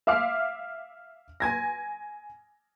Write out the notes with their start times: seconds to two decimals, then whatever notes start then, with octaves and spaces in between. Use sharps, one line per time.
0.07 E5 F5 D6 F6 C7
1.40 G#5 G#6 A#6